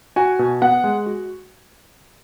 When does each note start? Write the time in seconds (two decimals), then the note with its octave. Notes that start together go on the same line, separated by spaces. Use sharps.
0.16 F#4 G#5
0.39 B2
0.62 B3 F#5
0.84 G#3
1.06 F#4